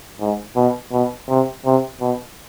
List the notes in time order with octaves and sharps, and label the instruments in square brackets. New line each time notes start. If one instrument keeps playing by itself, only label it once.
[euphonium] G#2
B2
B2
C3
C3
B2